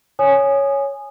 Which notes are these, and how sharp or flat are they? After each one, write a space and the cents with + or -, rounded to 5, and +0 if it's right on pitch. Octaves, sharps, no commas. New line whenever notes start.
C#5 +0 G#5 +0 D#6 -20